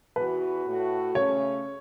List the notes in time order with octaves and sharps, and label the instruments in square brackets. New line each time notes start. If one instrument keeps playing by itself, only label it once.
[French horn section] E2 E3 B3 F#4 [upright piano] B4
[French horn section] A2 A3 F#4
[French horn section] C#3 A3 C#4 [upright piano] C#5